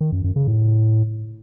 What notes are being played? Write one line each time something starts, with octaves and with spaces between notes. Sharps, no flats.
D#3
F#2
F#2
C#3
A2